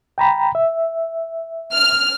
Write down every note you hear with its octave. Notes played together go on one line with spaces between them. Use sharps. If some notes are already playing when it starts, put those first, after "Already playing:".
G5 A#5 B5
E5
F6